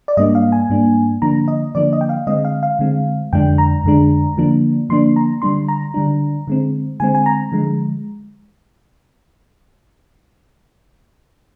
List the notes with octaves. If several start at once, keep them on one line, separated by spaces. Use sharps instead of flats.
D5
G#2 G3 A#3 D4 D#5
F5
G#5
G#2 G3 A#3 D4
D3 F3 A#3 D4 A#5
D#5
D3 F3 A#3 D4 D5
D#5
G5
F5
D3 G#3 C4 D#5
F5
F5
D3 G#3 C4
F2 D3 G#3 D4 G5
A#5
F2 D3 G#3 D4
D3 F3 A#3 D4
D3 F3 A#3 D4 C6
A#5
D3 G3 D4 C6
A#5
D3 G3 D4
D3 G#3 C4
D3 G#3 C4 G#5
G#5
A#5
D3 F3 G#3